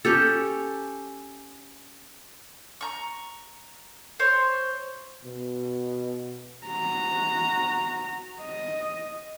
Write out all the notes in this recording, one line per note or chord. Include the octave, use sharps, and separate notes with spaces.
C#4 G4 A4
A#5 C#6
C5 C#5
B2
F#4 A#5
D#5